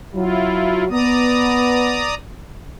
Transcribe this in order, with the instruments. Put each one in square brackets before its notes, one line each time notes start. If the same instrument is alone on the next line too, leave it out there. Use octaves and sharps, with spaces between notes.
[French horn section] F#3 [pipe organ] E4 F4
[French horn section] B3 [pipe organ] D5 A#5 D#6